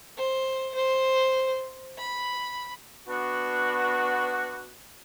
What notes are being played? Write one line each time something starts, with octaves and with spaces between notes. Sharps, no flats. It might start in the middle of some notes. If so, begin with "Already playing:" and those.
C5
C5
B5
B3 D4 F#4